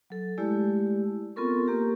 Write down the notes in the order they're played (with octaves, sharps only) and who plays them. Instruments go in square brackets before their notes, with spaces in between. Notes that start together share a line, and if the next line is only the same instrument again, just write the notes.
[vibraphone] F#3 A4
G#3 A3 E4 G4 D5 A5
B3 C4 F4 A4 A#4 C#6
A#3 G4 A#4